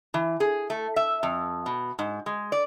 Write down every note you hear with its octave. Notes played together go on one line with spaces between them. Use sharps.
E3
G#4
A3
E5
F2
B2
G#2
G#3
D5